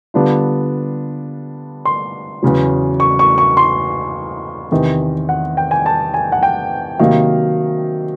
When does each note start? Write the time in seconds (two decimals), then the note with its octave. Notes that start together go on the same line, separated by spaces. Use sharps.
0.14 D3 G3 B3 D4 F4
1.85 C6
2.43 E2 C#3 F#3
3.00 C#6
3.19 C#6
3.38 C#6
3.57 C6
4.71 E2 C3 D#3
5.29 F#5
5.57 G5
5.71 G#5
5.86 A5
6.14 G#5
6.32 F#5
6.43 G5
6.99 C3 D#3 F#3 A#3 F5